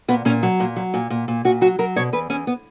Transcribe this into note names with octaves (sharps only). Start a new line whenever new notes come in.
A#2 B3
A#2 C#4
F#3
A#2
F#3
A#2
A#2
A#2
A#2 F#4
F#3 F#4
F#3 A#4
B2 C#5
E2 B4
E2 C#4
B3